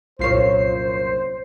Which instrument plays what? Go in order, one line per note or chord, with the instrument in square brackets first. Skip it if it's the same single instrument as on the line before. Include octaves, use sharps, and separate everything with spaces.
[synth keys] C2 F4 C7 [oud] F#2 A#2 C#5 [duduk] C5